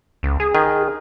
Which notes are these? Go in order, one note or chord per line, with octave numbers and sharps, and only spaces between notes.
C#2
G#4
D#3 G#4